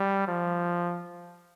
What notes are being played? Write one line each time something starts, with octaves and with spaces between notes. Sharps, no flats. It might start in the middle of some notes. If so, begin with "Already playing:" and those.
Already playing: G3
F3